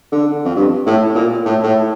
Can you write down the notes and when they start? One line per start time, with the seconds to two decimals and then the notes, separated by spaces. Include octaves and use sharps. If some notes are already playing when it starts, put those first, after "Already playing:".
0.12 D3
0.45 F2
0.56 G2
0.86 A2
1.15 A#2
1.45 A2
1.63 A2